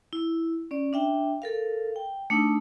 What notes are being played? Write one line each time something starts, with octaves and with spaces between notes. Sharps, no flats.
E4
C#4 D5
D4 E5 G5
A4 A#4 F5
G5
A3 D4 D#4 E6